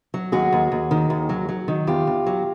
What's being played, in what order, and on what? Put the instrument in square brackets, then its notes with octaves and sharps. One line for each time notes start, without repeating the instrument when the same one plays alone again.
[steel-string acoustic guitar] F#3
D#2 F#4 G#4
D#2
D#2
D#3
D#2
F#3
F#3
D#3
E2 F4 G4
E2
F#3